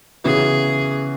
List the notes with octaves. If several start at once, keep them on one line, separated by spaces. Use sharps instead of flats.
C#3 E3 B3 F#4 G#4